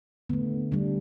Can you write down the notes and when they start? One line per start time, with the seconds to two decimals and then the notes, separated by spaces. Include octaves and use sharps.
0.29 D3 A3 B3
0.72 D3 G3 D4